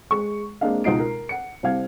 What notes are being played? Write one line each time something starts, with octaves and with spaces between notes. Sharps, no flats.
G#3 C#6
G#3 A#3 C4 D4 D#5 F5
C#2 B2 D#4 C7 D7
A#4
F#5 C#7
C2 C4 G4 F5 G#6